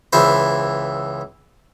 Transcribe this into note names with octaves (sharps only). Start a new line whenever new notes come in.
C#2 E3 E4 C5